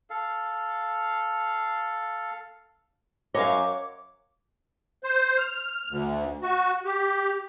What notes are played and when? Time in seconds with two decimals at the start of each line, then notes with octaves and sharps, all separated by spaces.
0.10 A4 F5
3.34 F#2 C#5 D#5 F5 D6
5.04 C5
5.38 F6
5.90 D2
6.42 F#4
6.85 G4